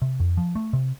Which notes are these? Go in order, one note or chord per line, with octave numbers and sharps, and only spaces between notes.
C3
F2
F3
A3
C3